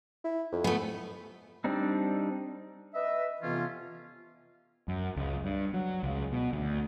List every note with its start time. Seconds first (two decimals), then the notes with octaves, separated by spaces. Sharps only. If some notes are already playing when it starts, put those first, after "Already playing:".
0.24 E4
0.52 F2
0.64 A3 B3
1.64 G3 C4 D4 D#4
2.94 B4 D#5 E5
3.42 F2 C3 E3 B3 C#4 F4
4.88 F#2
5.17 C#2
5.45 G2
5.74 F#3
6.03 C#2
6.32 B2
6.53 D2